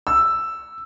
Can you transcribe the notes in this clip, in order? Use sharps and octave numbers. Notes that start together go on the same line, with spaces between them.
E6